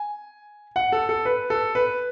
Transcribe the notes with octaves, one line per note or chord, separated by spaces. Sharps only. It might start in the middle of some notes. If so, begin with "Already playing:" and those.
Already playing: G#5
F#5
A4
A4
B4
A4
B4